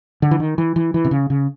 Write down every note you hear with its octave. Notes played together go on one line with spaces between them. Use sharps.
D3
E3
D#3
E3
E3
E3
C3
C#3
C#3